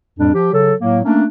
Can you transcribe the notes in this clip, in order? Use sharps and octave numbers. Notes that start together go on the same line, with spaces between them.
F2 A2 G3 D4
F3 G4
C#3 F#3 A4
A2 F#3 A#3
A3 A#3 C#4 D4